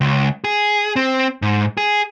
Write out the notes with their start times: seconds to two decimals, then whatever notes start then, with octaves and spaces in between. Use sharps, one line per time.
0.01 C#2
0.44 G#4
0.96 C4
1.42 G#2
1.77 G#4